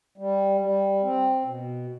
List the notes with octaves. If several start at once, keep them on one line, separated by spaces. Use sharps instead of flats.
G3
G3
C4
B2